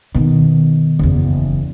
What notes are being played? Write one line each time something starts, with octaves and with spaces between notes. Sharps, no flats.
B2 D#3
F#1 E2